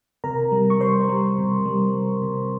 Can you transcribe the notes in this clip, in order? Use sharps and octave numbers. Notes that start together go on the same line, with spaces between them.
C3 A#4 A#5
G3
C#6
G3 C5 C6
G3
C3
G3
G3
C3